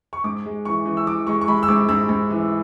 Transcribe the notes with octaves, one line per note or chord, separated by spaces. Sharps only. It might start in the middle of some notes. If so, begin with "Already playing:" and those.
C#6
G#2 D6
G#3
E3 C#6
E3
E6
E3 D6
G#3 C#6
C#6
G#3 B5
E6
G#2 D6
G#2 E6
G#2
E3